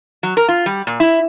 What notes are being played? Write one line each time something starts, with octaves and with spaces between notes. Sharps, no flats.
F#3
A#4
F4
G3
A#2
E4